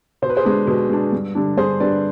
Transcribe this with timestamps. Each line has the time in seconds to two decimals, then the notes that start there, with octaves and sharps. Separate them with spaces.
0.22 B2 C5
0.30 B4
0.37 G#4 C5
0.45 G#3 D4
0.67 B2
0.90 G#3 D4
1.13 G2
1.35 D3 G3 D4
1.57 G2 G#4 C5
1.80 D3 G3 D4 B4 D5